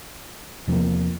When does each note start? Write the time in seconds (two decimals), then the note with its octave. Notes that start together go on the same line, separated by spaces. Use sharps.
0.67 E2 C3 F3 A#3